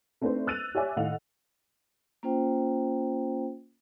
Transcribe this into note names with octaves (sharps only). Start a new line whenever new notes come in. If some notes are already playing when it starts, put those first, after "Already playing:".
A3 C4 D4 D#4 B4 C5
E6 F#6 A6 D#7 F7
G4 C#5 D5 E5 G#5 D6
A2 D#3 D#5 F5 F#5 F7
A#3 C#4 F4 C5 G5